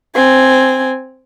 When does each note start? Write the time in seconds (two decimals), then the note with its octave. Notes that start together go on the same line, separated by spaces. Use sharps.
0.15 C4 G#5